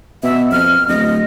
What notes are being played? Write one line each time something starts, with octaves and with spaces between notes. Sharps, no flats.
B2 E5
F2 F6
D1 D#5